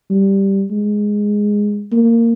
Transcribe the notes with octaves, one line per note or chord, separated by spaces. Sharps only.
G3
G#3
A#3